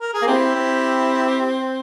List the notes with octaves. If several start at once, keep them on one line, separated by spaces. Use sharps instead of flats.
A#4
G#4
A#3
C4 E4 G4
C4
G4